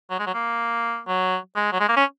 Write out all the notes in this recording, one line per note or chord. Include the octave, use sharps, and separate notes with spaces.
F#3
G#3
F#3
A#3
F#3
G#3
F#3
G#3
A#3
C#4